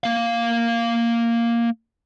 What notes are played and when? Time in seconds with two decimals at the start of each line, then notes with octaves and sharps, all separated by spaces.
0.04 A#3 F5